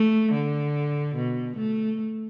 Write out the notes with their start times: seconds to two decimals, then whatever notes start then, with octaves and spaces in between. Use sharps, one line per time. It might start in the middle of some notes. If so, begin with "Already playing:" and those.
Already playing: A3
0.32 D3
1.15 B2
1.57 A3